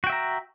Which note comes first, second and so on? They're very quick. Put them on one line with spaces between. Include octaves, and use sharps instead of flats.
F#4 G5 E5 A#5